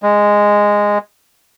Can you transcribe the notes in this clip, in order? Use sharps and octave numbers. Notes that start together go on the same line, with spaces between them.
G#3